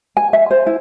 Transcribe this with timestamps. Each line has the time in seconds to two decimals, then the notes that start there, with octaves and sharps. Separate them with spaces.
0.17 G#5
0.33 E5
0.51 C5
0.67 E4